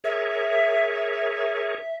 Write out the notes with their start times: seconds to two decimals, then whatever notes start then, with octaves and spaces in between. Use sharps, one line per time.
0.04 G#4 A#4 C#5 E5